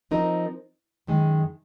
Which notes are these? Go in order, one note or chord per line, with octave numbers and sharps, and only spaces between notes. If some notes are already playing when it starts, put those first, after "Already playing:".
F3 C4 D#4 A#4
F#2 D#3 G#3